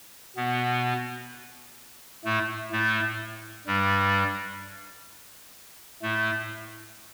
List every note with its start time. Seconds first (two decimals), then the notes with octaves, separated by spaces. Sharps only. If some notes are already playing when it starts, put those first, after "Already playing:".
0.36 B2 B3
2.25 A2 A3
2.72 A2 A3
3.67 G2 G3
6.02 A2 A3